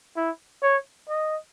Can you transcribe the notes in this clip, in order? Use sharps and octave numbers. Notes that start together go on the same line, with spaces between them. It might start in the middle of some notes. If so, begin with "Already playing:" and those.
E4
C#5
D#5